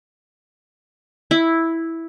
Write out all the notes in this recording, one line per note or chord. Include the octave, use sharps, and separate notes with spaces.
E4